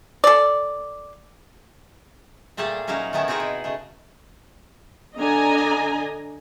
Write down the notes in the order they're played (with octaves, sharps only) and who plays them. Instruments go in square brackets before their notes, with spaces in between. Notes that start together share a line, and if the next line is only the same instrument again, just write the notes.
[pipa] A4 D5
[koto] A#2 G3 A3 G#4 A4 A5
F#3 C#4 D#4 E4 F5 A#5
D#3 E3 A3 B3 C#4 E4
C4 D#4 E4 G#4 A#4 B4
B2
C#3 A3
[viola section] D3 D4 D#5 G#5 A#5